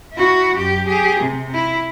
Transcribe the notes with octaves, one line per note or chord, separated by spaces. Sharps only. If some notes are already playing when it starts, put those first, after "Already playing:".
E4 F#4
F#2 G4
G4 G#4
C3
E4